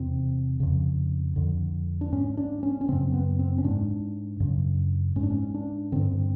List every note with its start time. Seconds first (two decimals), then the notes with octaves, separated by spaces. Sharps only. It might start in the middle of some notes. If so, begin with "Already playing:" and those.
Already playing: E2 C3 C4
0.60 F2 C#3
1.36 F2 D3
2.01 D4
2.12 G#2 C#4
2.37 D4
2.63 C#4
2.81 C#4
2.88 F#2 C#3 C4
3.13 B3
3.39 C4
3.58 C#4
3.64 G#2 D4
4.40 F#2 C#3
5.16 G#2 C#4
5.23 D4
5.31 C#4
5.54 D4
5.92 G2 D3 C4